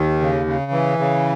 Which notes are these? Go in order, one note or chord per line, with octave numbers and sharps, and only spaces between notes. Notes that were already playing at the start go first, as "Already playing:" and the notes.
Already playing: D#2 D#3
C#3
C#3
E3
C#3